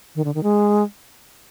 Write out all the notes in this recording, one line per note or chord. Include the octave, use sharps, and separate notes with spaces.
D#3
D3
D#3
G#3